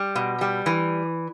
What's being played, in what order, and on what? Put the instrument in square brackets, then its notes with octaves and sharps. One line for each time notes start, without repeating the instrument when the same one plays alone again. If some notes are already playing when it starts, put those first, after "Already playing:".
Already playing: [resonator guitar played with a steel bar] G3
B2
G3
E3